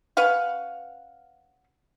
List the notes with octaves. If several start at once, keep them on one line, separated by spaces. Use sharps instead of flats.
C#4 B4 F5 F#5